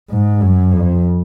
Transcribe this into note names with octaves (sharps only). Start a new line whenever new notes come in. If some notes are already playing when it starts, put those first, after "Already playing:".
G#2
F#2
F2